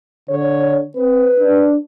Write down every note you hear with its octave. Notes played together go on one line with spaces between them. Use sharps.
D3 C#5
C4 B4
D4